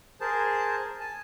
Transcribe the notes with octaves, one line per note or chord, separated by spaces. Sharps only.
G#4 A#4 C5 A5
G#5 A5